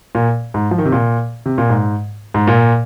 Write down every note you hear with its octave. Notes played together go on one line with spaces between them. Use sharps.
A#2
G#2
F3
D#3
C3
A#2
C3
A#2
G#2
G#2
A#2